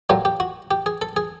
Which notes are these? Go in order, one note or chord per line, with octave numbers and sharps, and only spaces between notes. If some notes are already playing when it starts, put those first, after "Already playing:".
A#2 F#3 A3 G4
G4
F#4
G4
G#4
A4
G#4